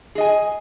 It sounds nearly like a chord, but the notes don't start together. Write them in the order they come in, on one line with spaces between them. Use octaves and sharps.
G#4 D#5 G#5